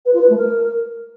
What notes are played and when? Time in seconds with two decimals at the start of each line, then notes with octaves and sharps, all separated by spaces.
0.05 B4
0.13 F4
0.21 B4
0.29 A3
0.37 A#4